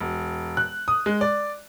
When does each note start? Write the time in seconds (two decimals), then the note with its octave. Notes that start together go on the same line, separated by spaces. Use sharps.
0.01 E1
0.57 F#6
0.88 D#6
1.06 G#3
1.21 D5